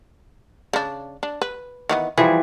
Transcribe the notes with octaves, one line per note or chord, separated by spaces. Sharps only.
C#3 D4
D4
B4
D#3 E3 B3
E3 F3 G3 G#4